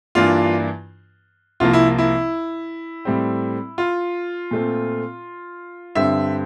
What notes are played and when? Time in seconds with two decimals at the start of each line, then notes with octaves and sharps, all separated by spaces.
0.15 G2 E3 A#3 D4 F4
1.60 C2 C3 F3 A#3 F4
1.73 E4
1.98 E4
3.05 A2 G3 C4
3.78 F4
4.51 A#2 A3 C4
5.95 G2 D3 G3 C4 E5